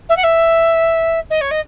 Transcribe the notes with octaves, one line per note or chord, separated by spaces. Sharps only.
E5
F#5
E5
D#5
C#5
D#5